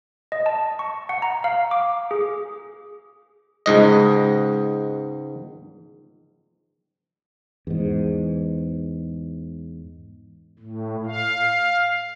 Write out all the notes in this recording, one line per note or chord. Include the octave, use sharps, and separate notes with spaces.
D#5
A5
C#6
F#5
A#5
F5
D6
G#4
C#2 G#2 D#5
E2 G#2
A2
F5